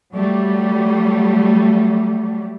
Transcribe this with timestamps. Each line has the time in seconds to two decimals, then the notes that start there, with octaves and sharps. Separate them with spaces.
0.13 F#3 G3 A3